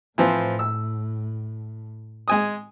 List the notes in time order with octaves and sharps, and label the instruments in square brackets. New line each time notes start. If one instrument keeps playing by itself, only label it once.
[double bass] A2 [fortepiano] E3 F3 C4
[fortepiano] E6
G#3 G#5 D#6